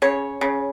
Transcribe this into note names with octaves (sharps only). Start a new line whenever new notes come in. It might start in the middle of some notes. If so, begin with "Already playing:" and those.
C#3 C#5
C#3